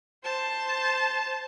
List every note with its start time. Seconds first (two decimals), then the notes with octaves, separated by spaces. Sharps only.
0.24 C5 A5